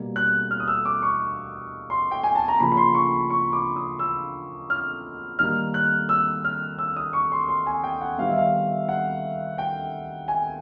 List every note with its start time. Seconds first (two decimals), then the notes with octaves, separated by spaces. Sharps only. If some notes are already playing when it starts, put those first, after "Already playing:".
Already playing: B2 G3 A#3
0.16 F#6
0.51 F6
0.60 D#6
0.68 E6
0.85 D6
1.02 C#6
1.90 C6
2.11 G5
2.23 G#5
2.35 A5
2.48 A#5
2.60 C#3 F3 A#3 B5
2.72 B5
2.77 C6
2.95 C#6
3.30 C#6
3.53 D6
3.76 D#6
3.99 E6
4.70 F6
5.39 D#3 G3 A#3 F6
5.74 F#6
6.09 E6
6.45 F6
6.79 E6
6.96 D#6
7.13 C#6
7.32 C6
7.48 C6
7.66 G#5
7.84 G5
8.01 F#5
8.18 D#3 G3 B3 F5
8.29 E5
8.38 F5
8.89 F#5
9.58 G5
10.28 G#5